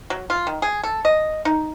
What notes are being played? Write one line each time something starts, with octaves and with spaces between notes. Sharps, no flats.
F#3
F4
D#3
G#4
A4
D#5
D#4